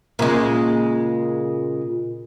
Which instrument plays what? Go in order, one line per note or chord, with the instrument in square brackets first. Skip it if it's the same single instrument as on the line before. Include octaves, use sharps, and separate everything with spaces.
[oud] A#2 C#3 G#3